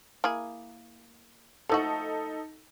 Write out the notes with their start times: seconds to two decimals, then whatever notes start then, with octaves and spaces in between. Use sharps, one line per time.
0.24 A#3 E4 G#4
1.69 F3 A3 D#4 F#4 A4